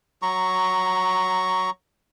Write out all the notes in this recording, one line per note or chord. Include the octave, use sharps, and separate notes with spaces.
F#3 A#5 C#6